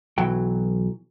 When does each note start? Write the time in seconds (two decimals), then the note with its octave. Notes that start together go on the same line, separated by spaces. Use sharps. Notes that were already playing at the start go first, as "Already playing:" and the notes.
0.18 B1 E3 F#3 G5